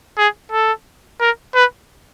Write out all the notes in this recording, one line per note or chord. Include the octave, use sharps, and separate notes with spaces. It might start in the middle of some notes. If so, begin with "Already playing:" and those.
G#4
A4
A#4
B4